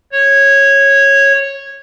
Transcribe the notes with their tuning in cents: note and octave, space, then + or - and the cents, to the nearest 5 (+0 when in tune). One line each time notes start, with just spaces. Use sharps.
C#5 -10